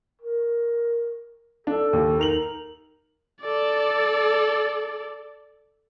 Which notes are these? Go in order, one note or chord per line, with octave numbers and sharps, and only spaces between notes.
A#4
D4 A4
D#2
D#4 A#4 F7 F#7
A4 D5